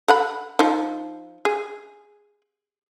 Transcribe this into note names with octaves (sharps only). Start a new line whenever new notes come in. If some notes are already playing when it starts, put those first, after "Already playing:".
A4 F#5 B5
F3 D#4
G#4